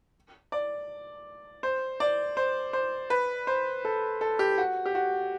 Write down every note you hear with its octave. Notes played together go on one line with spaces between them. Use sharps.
D5
C5
D5
C5
C5
B4
C5
A4
A4
G4
F#4
G4
F#4